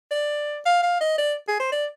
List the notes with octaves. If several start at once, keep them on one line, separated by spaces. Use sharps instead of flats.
D5
F5
F5
D#5
D5
G#4
C5
D5